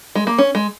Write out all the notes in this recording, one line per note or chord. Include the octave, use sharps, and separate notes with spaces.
G#3
A#3
C#4
G#3